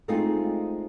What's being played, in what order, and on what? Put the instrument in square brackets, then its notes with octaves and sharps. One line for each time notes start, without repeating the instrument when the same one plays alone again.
[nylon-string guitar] G#3 A3 C4 D#4 F4 G#4